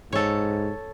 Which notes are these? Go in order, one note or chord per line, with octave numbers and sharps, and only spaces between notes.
G#2 A4 C#5